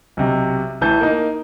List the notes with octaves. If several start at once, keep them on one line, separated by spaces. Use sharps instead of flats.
B1 C3
A1 E3 A5 G6
A#3 D#4